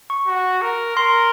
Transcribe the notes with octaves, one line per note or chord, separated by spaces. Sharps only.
C#6
F#4
A#4
A#4 C6